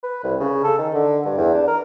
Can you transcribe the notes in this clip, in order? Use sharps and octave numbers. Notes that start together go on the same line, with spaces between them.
B4
C2
C#3
A4
D#3
D3
G2
E2
D4
A#4